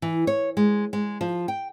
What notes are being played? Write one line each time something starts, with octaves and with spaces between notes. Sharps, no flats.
E3
C#5
G#3
G#3
F3
G5